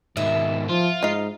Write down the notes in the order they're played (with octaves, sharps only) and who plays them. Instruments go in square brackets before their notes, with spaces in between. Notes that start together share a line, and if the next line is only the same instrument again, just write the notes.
[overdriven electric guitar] G#2 B2 [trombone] D#3 [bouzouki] E5
[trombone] F3 [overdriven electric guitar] F4
[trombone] G#2 [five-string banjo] D#4 F5